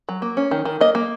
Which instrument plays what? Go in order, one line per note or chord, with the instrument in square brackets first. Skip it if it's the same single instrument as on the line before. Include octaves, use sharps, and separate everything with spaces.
[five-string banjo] F#3
A#3
C#4
D#3
D#3
A#3 D#5
A#3